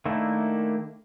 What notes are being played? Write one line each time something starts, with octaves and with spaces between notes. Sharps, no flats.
D#3 A3 A#3 D4 E4